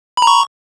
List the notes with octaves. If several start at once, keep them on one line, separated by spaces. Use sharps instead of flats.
A#5 B5 C#6